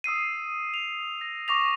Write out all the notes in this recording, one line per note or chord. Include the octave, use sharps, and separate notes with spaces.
D#6 E6 C7 D#7
F7
A#6
C#6 D6 A#6 F7